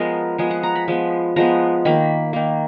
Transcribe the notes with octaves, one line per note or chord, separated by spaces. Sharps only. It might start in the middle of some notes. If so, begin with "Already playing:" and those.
Already playing: F3 G#3 B3 A#4
F3 G#3 B3 G#4
F#5
A#5
B5
F3 G#3 B3
F3 G#3 B3 A#5
D#3 A#3 B5
D#3 A#3